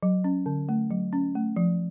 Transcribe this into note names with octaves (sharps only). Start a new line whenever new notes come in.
F#3
C#4
D3
A3
F#3
C#4
A3
F3